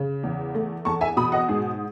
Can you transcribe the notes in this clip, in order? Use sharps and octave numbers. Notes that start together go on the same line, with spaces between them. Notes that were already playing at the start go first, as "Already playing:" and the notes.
Already playing: C#3
E2
A3
E2 A5 C#6
E5 G#5
B2 B5 D#6
D#5 F#5
G#2 G#4